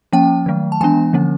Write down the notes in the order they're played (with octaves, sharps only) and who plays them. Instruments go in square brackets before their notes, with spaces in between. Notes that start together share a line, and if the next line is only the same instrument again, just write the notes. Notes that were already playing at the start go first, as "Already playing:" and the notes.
[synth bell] F3 A#3 C#4 G5
D#3 F#3 A3
A5
E3 G#3 B3 D4 G#5
D3 F3 A#3 C#4